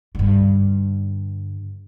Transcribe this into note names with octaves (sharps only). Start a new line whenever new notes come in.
G2 D3